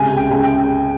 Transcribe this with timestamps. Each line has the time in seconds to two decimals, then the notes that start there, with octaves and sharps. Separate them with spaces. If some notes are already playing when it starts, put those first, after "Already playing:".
Already playing: C#2 C3 G#5
0.10 C#2
0.17 G5
0.31 C#2
0.43 G5